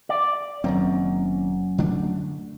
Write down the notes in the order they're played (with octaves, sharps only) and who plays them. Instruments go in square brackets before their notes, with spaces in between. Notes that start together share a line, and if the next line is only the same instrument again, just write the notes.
[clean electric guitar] D5
[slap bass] F#1 D#3 C4 [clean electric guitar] F#2
[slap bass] D3 A3 D4